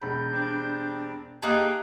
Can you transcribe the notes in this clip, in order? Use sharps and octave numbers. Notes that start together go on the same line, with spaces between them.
E1 B5 G6
G3 C4 D4
A#3 D#4 G4 G#4 G5 A5 D#6 F#6